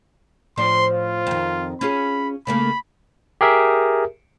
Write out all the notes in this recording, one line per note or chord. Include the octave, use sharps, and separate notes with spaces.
A2 F3 D4 C6
F4
F2 D#3
C#4 F4 G#4 B5
C#3 A3 A#3 B5
G4 G#4 A#4 E5